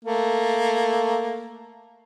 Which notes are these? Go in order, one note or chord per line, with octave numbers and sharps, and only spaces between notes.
A3 A#3